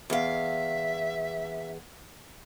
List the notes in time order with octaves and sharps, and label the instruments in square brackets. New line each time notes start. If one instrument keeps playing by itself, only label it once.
[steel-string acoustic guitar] E2 F5 [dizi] E5